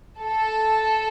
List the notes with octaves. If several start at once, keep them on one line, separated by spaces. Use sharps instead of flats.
A4